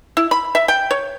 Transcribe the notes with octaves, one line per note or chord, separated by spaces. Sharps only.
E4
B5
E5
G5
C#5